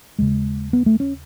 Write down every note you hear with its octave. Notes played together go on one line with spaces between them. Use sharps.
D#2 C#3 G#3
B3
A3
C#4